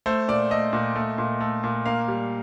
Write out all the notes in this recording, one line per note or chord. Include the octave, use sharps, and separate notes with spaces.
A3 C5
A#2 D5
A3 D#5
A#2
A3
A#2
A3
A#2
A#3 F5
G3